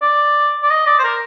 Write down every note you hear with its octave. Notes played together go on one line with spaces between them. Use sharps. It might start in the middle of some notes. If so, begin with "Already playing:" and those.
D5
D5
D#5
D5
C5
A#4